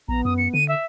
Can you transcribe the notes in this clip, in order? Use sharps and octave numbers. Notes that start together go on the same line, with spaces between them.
A#1 B3 A#5
F#2 D#6
C#7
D3 D#7
E5